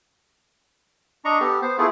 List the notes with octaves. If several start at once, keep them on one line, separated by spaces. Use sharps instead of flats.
D4 D#5 A#5 C#6
B3 G4 A4
B3 C5
A3 B3 E4 F4 G#4 A4